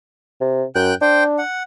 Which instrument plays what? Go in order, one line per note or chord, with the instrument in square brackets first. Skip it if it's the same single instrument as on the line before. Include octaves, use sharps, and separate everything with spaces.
[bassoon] C3
[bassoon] F#2 [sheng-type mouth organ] G5 F#6 G6
[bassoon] D4 [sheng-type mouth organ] C5 G5
[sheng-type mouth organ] F#5